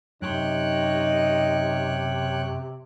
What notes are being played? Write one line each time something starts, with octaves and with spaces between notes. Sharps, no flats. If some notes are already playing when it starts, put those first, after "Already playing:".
F#2 C3 D#4 G#4 C#5 G5 C6 F#6